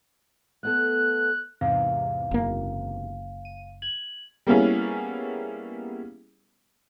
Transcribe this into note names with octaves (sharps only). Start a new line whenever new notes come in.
A3 B3 A4 F#6
E2 G#2 C3 F5
F#1 A#3
D#7
G#6 F#7
G3 A#3 B3 C#4 E4 G#4